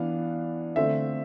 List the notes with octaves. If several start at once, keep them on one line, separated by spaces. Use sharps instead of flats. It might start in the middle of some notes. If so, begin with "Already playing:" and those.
Already playing: E3 B3 D4 F5
D3 A3 C4 E5